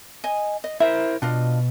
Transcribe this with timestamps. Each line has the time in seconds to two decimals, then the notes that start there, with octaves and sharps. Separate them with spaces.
0.24 D#5 G#5
0.64 D#5
0.80 E4 A#4 C5 E5
1.22 B2 D4 F4 D#5